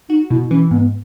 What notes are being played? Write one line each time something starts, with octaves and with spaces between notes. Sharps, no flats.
D#4 F#4
B2 E4
E3 C#4
G#2 B3